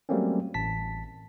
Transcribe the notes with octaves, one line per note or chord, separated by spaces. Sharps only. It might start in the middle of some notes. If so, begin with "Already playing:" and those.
F#3 G3 A3 A#3 C4 C#4
A1 A5 B6